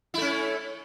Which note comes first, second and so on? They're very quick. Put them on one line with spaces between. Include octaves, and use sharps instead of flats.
E4 A3 C#4